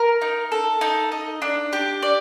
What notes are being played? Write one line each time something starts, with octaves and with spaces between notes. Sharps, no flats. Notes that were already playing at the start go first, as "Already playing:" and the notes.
Already playing: A#4
D#4
A4
D#4
D#5
D4
G4
D5